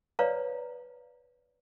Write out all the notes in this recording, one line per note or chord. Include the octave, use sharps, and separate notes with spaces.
B4 C#5 D5 F5 A#5